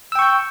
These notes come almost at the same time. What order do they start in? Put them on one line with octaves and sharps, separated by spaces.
E6 G5 C#6 G6